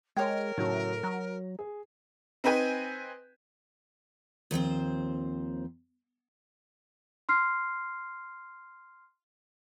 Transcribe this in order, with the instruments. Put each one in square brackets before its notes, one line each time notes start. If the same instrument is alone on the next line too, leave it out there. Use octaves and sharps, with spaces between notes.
[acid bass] G#3 [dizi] A#4 [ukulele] C#5 G5
[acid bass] A2 [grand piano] C#3 F#3
[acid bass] F#3 [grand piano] A#5
[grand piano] G#4
[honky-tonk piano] C4 D#4 B4 G5 G#5
[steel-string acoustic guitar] D#2 F3 C4 C5
[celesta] C6 F6 C7